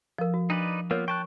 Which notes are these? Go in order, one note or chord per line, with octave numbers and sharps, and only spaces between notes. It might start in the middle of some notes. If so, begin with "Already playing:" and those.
F3 A4 A#4
F#4
D4 D#4 B4 D5
A#3 B3 F4 A#4 C#5
G5 A5 C#6 F#6